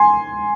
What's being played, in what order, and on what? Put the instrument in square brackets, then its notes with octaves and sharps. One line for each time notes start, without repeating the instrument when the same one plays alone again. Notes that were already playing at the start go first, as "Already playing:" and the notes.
Already playing: [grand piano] G#5 C6